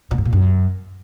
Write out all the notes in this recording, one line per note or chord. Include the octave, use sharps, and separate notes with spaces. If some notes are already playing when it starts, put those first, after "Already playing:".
A#2
A2
A#2
F#2